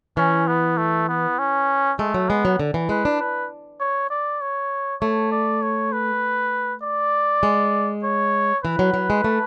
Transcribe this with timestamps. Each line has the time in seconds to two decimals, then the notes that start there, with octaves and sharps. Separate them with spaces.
0.17 E3 C#4
0.47 B3
0.77 A3
1.09 B3
1.39 C#4
1.99 G#3 A3
2.14 F#3
2.29 G#3 B3
2.45 F#3
2.60 D3
2.74 E3
2.89 G#3 B4
3.05 D4
3.20 B4
3.80 C#5
4.10 D5
4.41 C#5
5.01 A3 C#5
5.32 D5
5.62 C#5
5.93 B4
6.83 D5
7.43 G#3
8.03 C#5
8.64 E3 B4
8.79 F#3
8.94 F#3
9.10 G#3
9.24 A3